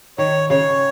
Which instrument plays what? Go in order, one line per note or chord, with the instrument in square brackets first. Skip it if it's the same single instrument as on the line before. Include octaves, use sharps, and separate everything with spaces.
[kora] D#3 [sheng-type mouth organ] C#5
[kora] C#3 [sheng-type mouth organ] C#5